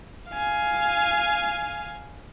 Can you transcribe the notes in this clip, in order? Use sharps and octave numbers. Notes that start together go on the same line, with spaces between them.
F5 G#5